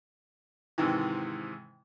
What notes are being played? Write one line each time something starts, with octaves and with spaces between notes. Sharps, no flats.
G#2 C3 D#3 E3